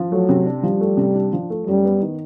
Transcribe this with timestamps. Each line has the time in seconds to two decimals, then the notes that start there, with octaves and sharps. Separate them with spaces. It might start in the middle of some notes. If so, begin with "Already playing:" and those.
Already playing: F3
0.11 F#3 A3
0.29 C3
0.46 D4
0.63 F3 G3
0.81 A3
0.97 C3
1.14 D4
1.33 F3
1.50 A3
1.67 F#2 G3
1.85 B3
2.02 D#3